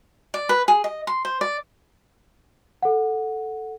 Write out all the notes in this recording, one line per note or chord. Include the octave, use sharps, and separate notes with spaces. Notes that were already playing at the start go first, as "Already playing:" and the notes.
D5
B4
G#4
D#5
C6
C5
D5
A4 F#5